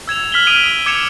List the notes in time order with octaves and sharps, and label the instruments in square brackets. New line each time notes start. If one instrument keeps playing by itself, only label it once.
[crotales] E6 G#6 E7 F7
F6 B6 F#7 G7
D#6 G#6 D7 D#7 F7
D6 G#6 C#7 E7 F7